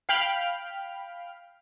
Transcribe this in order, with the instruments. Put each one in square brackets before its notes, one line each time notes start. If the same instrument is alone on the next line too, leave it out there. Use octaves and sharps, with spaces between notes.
[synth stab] F5 G5 B5 F6